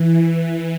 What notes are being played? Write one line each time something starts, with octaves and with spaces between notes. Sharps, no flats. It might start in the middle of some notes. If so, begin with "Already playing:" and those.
Already playing: E3